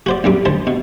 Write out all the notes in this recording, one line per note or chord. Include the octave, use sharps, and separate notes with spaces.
F#4 C5 D5
B1 F#2 G3 D6
D2 C5 A5
B2